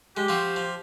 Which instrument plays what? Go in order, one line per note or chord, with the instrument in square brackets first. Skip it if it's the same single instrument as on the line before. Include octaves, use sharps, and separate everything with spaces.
[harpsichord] G#3 [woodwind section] G4
[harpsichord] F3 C4 F#4
F3